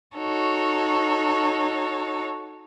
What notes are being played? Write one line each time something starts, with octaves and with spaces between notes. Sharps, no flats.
D#4 F#4 A4 C#5